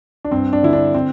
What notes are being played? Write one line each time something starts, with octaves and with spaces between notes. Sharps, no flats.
D4
G2 C4
D4
D3 E4
D4
C4